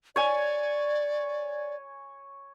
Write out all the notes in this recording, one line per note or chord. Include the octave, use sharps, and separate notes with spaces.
C#5 D5 G#5